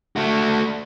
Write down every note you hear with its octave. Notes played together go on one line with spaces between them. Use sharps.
A3 F#4